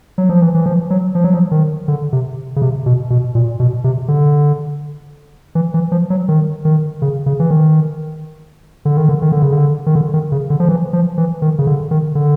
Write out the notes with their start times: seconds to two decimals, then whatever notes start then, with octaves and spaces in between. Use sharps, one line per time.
0.18 F#3
0.29 F3
0.42 E3
0.54 E3
0.66 F3
0.90 F#3
1.15 F3
1.24 F#3
1.34 F3
1.51 D#3
1.88 D3
2.13 C3
2.56 C#3
2.62 C3
2.86 B2
3.10 B2
3.35 A#2
3.60 B2
3.84 C3
4.08 D3
5.55 E3
5.74 E3
5.92 F3
6.10 F#3
6.28 D#3
6.65 D#3
7.02 C#3
7.26 C#3
7.40 E3
7.51 D#3
8.85 D3
8.97 D#3
9.09 D3
9.22 D#3
9.32 D3
9.42 C#3
9.52 D3
9.86 D#3
9.95 D3
10.14 D#3
10.32 C#3
10.50 D3
10.60 F3
10.69 E3
10.93 F3
11.18 E3
11.42 D#3
11.59 C#3
11.67 D3
11.91 D#3
12.15 D3